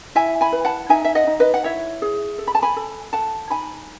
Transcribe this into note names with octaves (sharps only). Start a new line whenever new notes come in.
E4 E5 G#5
G#5 B5
B4
F#5 A5
D#4 E5 G#5
E5
D#5 F#5
D#4
B4 D#5
F#5
E4 C#5 E5
G#4
A4
B5
A5
G#5 B5
A4
A4 F#5 A5
D#4 G#5 B5